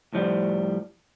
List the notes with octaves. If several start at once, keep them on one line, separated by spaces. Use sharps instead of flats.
A2 F3 G3